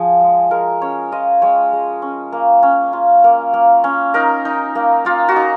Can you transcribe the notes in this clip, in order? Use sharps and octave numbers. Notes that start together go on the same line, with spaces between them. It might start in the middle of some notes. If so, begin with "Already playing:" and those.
Already playing: F3 G#4
G#3
G#3 A#4
C#4 C#5
F4 D#5
G#3 C#5
G#3
C#4
A#3
C#4
F4
A#3
A#3
C#4
D#4 A#4
D#4
A#3
A#3 F4
F#4
D#4